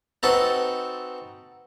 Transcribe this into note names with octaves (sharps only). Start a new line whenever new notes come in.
C4 D#4 F#4 A4 B4 C5